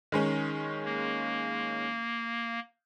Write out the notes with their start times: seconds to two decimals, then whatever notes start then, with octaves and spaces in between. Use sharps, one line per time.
0.12 D#3 G#3 C#4
0.85 A#3